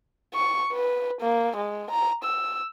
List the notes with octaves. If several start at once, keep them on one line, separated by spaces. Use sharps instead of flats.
C#6
B4
A#3
G#3
A#5
E6